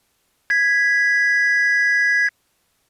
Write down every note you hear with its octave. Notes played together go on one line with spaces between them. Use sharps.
G#6 B6